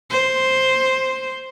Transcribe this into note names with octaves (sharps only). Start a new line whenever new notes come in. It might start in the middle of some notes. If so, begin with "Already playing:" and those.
C5